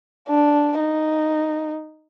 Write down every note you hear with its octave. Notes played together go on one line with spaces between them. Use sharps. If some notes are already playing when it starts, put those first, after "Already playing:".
D4
D#4